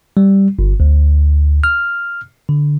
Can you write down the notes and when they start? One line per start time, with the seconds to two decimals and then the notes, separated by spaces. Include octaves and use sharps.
0.17 G3
0.59 G1
0.80 D2
1.64 F6
2.49 D3